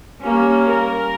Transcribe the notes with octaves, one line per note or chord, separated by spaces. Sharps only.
G3 A#3 C#4
A#4